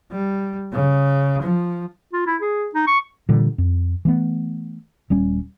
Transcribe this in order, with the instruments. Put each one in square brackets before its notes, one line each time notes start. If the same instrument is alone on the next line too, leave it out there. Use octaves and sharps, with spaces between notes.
[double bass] G3
C#3
F3
[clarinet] F4
E4
G#4
D#4
C#6
[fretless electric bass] A#2 D3 E3 G3
F2
E3 A3 B3
D#1 G3 C#4